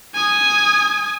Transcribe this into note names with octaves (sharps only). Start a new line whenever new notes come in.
G#5 D#6